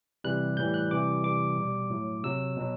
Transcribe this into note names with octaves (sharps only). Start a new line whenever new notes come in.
C3 E3 G3 F#6
A2 E3 G3 G6
F#6
C3 E3 G3 D6
C3 E3 G3 D6
B2 G3
A2 F#3
C3 F#3 E6
B2 F#3